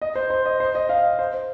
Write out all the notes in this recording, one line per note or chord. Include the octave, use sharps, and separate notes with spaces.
D#5
C5
C5
D#5
C5
D#5
F5
C5
C5